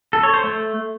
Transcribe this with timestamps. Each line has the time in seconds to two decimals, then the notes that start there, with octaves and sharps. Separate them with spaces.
0.13 A4
0.23 C#5
0.34 C5
0.44 A3